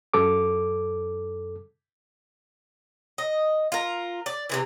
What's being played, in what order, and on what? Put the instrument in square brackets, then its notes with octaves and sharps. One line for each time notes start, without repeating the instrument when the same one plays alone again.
[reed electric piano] F#2 A4 D6
[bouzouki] D#5
F4 A#4
D5
C3 D#3 E3